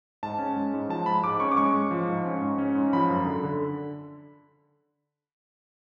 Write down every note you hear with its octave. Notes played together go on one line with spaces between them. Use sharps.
G#2 A5
C#4
G#3
G#2
F3 A5
G#3 B5
G#2 D6
C#4 C#6
D6
G#3 C#6
G#3
F3
G#2
C#4
G#2
C#4
G#2
F3 B5
F#2
D3
D3